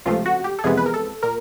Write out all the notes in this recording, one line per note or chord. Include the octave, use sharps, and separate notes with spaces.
C#2 C3 F3 A3 F4
F#4
G4
A4
F2 C3 E3 G#3 B3 G#4
B4
A#4
A4
A#2 A#4